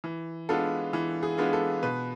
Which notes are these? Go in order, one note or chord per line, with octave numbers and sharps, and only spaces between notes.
E3
G#3 B3 D4 F4 A4
E3
G#4
G#3 B3 D4 F4
A4
B2 B4